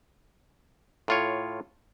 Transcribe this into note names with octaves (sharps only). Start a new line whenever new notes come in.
A2 F4 C#5